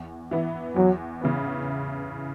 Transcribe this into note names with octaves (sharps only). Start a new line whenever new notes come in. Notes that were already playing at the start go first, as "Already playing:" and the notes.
Already playing: E2
E3 B3 E4
E2 F#3
C#3 E3 B3